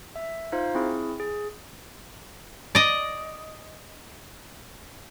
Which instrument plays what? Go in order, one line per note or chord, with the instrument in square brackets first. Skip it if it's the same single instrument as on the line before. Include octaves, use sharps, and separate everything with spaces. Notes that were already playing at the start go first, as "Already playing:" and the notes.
[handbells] E5
D#4 F4 C5 F5
C4 E4 G#4
G#4
[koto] D5 D#5